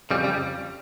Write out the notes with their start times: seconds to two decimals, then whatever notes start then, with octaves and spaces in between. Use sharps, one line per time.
0.10 F2 C#3 G3
0.24 G3